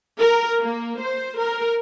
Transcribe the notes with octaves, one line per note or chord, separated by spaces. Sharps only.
A#4
A#3
C5
A#4